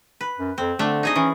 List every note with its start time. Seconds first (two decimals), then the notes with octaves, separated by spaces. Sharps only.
0.21 B4
0.38 F#2
0.58 F2 C4
0.79 D3 A3 D4 E5
1.03 D#4 G#4 D#5
1.16 E3 C#4